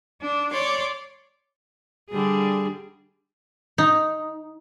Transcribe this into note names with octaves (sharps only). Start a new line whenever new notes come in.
D4
C#5 D5 C6 D6
D3 G3 G#4
D#4